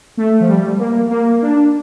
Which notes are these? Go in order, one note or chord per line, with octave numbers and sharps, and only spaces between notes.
A3
F3
G3
A#3
A#3
D4